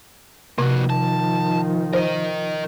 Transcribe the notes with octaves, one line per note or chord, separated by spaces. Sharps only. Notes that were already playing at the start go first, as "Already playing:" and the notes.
C3 D#3 F3 A#3 F#4
A5
A#4 C5 D#5